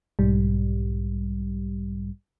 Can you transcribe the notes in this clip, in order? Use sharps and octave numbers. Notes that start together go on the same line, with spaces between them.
B1 G#2 G3